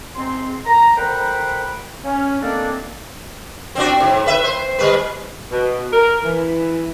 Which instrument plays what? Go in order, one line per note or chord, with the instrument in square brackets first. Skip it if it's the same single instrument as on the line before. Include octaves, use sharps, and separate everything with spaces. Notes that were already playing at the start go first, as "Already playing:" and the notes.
[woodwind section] G#2 C4 C6
A#5
D2 A#4 C5 F#5 G5 B5
C#4
D#3 A3 A#3 C4 D4
[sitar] C4 D4 F#4
G#2
B4 E5
C5
G3 B4
[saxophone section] B2
A#4
E3